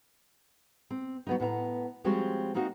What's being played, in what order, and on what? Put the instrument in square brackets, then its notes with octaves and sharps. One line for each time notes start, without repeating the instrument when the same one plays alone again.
[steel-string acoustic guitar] C4
F#3 B3 D#4
A2 B3 E5 A#5
F3 G3 G#3 C4 F#4 C#5
G#3 A#3 C4 D#4 F#4